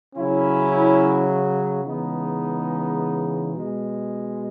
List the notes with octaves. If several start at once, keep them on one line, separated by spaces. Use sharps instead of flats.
C#3 F#3 C#4 E4
C#3 E3 G#3 B3 D#4
B2 G#3